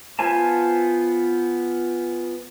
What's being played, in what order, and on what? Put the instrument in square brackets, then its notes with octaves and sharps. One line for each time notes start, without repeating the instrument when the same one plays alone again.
[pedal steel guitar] B3 F4 C5 G#5 A5